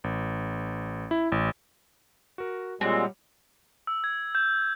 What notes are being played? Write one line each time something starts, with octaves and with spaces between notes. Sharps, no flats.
A1
E4
A1
F#4 A#4
A#2 G3 G#3 C4 F#4 C#5
E6
G#6
G6